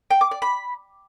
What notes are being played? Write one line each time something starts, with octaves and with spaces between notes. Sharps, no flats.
G5
D6
D5
B5